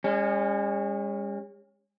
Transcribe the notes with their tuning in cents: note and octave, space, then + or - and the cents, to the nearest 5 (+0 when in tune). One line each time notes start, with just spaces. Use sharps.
G#3 -45 C#4 +0